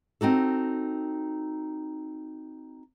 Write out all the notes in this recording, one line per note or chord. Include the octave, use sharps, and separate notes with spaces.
C4 D#4 F#4 A4